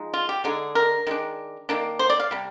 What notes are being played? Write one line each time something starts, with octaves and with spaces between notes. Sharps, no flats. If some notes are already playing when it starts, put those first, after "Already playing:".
Already playing: F3 G#3 D#4
F4
G4
D3 G#3 D#4 G#4
A#4
D#3 G#3 D4
D#3 A#3 D4
C5
D5
F5
C3 G3